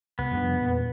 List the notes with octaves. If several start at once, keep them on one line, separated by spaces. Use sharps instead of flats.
C2 B3
F2 G3 D4
E2 A#2